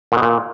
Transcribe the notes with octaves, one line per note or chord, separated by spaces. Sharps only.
A#2
B2
A#2